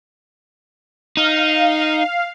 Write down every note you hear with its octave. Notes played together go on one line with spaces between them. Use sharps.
D#4 F5